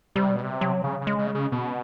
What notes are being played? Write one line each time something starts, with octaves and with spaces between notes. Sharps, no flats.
C3 G3
B2
C3
F#3
C#3
C#3
G#3
C#3
C#3
B2